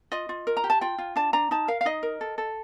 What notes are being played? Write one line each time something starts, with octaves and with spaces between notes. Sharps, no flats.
F4 D#5
F4
A#4
A#5
G4
A5
F4 G5
F4
D4 A5
D4 A#5
D#4 A5
A#4 F5
F5
D#4 D#5
A#4
A4
A4